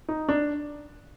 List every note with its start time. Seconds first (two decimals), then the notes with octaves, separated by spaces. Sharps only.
0.09 D#4
0.29 D4